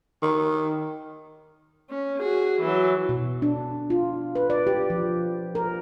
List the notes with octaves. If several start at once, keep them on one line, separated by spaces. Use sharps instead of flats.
D#3
C#4
F#4 G#4
E3 F#3
B2
D4
F4
B4
D5
G4
F3
A#4